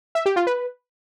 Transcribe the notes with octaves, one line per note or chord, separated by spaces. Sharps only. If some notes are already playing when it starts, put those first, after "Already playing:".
E5
G4
F4
B4